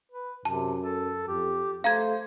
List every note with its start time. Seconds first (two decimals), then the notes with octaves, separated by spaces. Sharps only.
0.12 B4
0.45 F#2 C3 A5
0.82 A4
1.28 F2 G4
1.84 A3 C5 F5 A#5 G#6